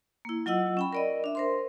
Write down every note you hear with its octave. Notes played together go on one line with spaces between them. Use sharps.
A#3 E4
F#3 F4 D#5 F#5 E6
C#4 G5 B5
A#4 D5 D#5
D4 E5
A#4 C5 C6